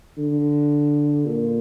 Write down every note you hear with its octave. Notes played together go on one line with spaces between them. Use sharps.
D3
A#2